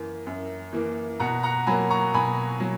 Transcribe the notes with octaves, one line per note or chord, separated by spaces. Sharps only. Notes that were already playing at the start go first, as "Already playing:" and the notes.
Already playing: F#2 E3 A#3
F#2
E3 A#3
B2 F#5 A#5
F#5 A#5
F#3 A#3 G#5 B5
A#5 C#6
B2 G#5 B5
F#3